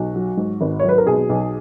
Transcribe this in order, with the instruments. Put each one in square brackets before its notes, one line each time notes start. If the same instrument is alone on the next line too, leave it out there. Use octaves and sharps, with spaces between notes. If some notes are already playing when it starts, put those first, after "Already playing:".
Already playing: [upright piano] B1 F#4
F#3
G#2
G#1
F#3 C#5
B4
A#4
B2 G#4
B1